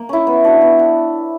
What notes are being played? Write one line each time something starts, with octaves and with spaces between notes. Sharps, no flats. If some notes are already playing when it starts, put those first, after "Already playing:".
Already playing: A#3
C#4 E4
B3
D4 F#4
B3
D4